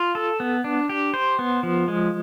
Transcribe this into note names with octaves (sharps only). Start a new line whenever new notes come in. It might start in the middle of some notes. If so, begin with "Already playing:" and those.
Already playing: F4
A4
B3
D4
G4
C5
B3
F3
G#3